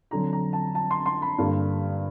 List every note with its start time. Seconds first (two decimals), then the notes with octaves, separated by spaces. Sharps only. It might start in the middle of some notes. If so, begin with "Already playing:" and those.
0.11 F2 D3 F#3 A#5
0.33 A#5
0.53 A5
0.75 A5
0.91 C6
1.06 C6
1.22 B5
1.38 G2 D3 G3 A#3